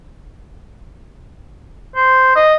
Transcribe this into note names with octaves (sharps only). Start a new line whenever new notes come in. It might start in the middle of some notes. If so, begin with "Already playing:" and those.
C5
D#5